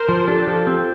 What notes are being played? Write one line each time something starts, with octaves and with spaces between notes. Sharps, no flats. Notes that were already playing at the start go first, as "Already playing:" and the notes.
Already playing: A#4 C5
F3
D4 G4 A4
F3
C4